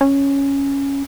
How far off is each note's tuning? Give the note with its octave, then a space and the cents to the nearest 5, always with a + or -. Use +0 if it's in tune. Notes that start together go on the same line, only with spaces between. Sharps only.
C#4 +0